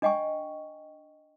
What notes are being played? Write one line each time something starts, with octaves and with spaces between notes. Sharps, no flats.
D4 D#5 G5 G#5 C#6